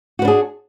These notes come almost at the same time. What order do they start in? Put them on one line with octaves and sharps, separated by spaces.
F#4 B4 D4 G#4